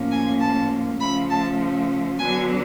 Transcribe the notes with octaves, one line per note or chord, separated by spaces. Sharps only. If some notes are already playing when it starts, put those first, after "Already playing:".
Already playing: A2 F3 A#3 C#4
G#5
A5
C#3 F3 A3 B5
A5
D3 F#3 B3 D4 G#5